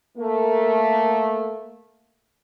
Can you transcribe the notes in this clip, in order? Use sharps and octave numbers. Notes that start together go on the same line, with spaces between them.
A3 A#3